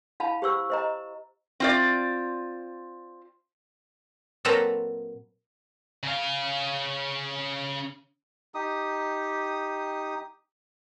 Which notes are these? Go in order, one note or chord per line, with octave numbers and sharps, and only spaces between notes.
E4 F5 A5 B5
G4 C5 C#6 E6
C5 D#5 A#5
C4 F4 D5
A#2 F#3 C4 A4 B4 A#5
C#3 F5
D#4 G4 D#6